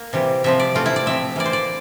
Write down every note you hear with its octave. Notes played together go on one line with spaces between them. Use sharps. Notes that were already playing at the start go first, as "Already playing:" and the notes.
Already playing: A#3
C3 E3 G3
C3 F3 C4 E5
D5
E3 A3 C4 F4
E4
D5
C3 F3 C4 E5
E3 A#3 D5
C5
D5